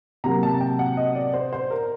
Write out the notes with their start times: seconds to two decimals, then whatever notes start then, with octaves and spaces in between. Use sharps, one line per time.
0.24 C3 F#3 A#3 A#5
0.43 A5
0.61 G5
0.79 F#5
0.97 D#5
1.15 D5
1.34 C5
1.53 C5
1.71 A#4